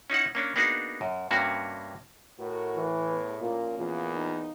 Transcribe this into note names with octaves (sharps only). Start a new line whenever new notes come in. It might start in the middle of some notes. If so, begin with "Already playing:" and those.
C#4 D#4 E4 F#5
A#3 C#4 D4
A#3 B3 D4 D#4 F#4 G#4
F#2
G2 C3 A#3 C#4 F#4
A2 F#4 A#4
E3
E2
A#2 F3 A#3 C#4
E2 A#2
D#2 D#4